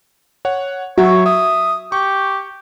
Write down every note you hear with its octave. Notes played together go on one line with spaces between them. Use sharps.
C#5 F#5
F#3 F#4 C#5 E5
E5 D#6
G4 C#6